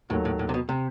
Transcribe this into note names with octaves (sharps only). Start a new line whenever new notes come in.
D#2 A2 D#3 F#3 A3
A2
A2
C3
B2
C3